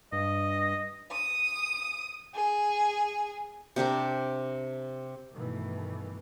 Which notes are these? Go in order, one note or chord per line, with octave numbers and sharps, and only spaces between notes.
G2 D#5
D#6
G#4
C3 D4 G4 A#4
G2 B2 D#3 E3 A3